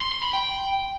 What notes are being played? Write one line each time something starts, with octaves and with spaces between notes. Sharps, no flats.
C6
C6
B5
G5